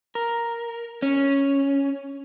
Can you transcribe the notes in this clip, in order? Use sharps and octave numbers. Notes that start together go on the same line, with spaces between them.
A#4
C#4